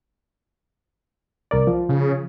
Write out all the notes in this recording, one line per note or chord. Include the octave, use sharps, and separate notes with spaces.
C2 A#4 D5
F3
C#3